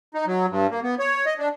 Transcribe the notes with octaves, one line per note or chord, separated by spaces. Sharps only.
D#4
F#3
G2
A#3
B3
C#5
D#5
D4